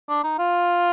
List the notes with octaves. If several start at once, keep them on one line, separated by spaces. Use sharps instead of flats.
D4
D#4
F4